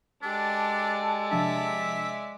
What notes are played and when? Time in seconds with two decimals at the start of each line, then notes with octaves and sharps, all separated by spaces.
0.23 G#3 D4 G4 A4 D5 A5
1.31 C3 F3 D4 E5